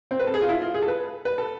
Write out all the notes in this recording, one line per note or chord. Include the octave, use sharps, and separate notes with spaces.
C4
B4
A4
G#4
F4
E4
F4
G#4
A4
B4
B4
A4